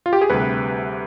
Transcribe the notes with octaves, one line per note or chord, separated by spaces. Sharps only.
F4
G4
G#4
D2 C3 G3 B4